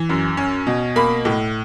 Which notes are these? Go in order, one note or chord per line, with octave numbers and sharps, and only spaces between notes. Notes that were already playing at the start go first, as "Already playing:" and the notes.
Already playing: E3
F#2
C#4
B2
A#3 B5
A2